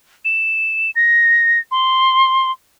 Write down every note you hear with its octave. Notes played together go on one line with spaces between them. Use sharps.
E7
A#6
C6